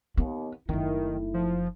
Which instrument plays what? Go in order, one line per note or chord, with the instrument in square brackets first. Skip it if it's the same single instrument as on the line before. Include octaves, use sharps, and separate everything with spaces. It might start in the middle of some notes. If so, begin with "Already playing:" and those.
[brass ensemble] D#2 [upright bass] B3
[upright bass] F#1 D#4 [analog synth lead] D#3 [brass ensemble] A3 E4
[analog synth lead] F3